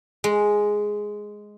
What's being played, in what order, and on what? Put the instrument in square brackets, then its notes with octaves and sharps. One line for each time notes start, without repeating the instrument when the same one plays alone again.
[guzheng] G#3